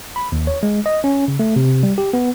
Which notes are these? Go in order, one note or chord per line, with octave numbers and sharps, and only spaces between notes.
B5
D#2
C#5
G#3
D#5
C#4
C#3
A3
C3
G3
G4
B3